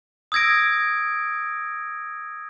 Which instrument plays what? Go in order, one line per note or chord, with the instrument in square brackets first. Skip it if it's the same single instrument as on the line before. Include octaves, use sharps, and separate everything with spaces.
[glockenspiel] D#6 E6 G#6 A#6 D7